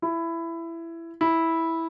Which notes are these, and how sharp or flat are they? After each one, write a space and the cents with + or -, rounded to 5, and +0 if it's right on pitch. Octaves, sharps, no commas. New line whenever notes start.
E4 +15
E4 -10